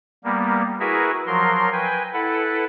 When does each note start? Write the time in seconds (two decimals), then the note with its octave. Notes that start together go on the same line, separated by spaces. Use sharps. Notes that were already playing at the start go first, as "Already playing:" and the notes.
0.24 G3 A#3 B3
0.80 E4 F#4 G#4 A#4 B4 E5
1.27 F3 F#3 A#4 C6
1.72 B4 G5 G#5
2.13 E4 A4 B4 F#5